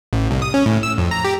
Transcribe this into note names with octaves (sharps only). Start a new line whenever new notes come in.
A1
C2
D#6
C#4
A2
E6
F2
A#5
G4